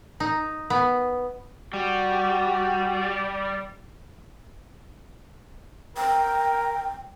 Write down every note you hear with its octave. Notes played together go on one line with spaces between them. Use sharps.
D#4
B3
G3 F#4
A#4 G5